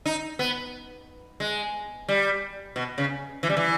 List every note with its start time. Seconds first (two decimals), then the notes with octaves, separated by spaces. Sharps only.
0.06 D#4
0.39 B3
1.40 G#3
2.08 G3
2.76 B2
2.98 C#3
3.43 E3
3.49 G3
3.57 E3